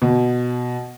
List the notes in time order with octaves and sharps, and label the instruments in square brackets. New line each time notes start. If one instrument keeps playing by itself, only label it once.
[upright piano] B2